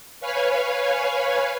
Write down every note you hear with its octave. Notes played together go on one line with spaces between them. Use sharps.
B4 C#5 F5 G#5